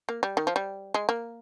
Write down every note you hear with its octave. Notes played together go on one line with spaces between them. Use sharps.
A#3
G3
D#3
F3
G3
G#3
A#3